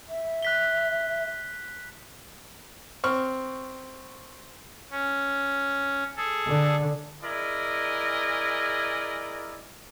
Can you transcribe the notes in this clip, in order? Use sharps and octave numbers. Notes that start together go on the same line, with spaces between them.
E5
F#6 B6 G7
C4 C#6 F6
C#4
G#4 A4
D3
E4 G#4 A#4 D5 D#5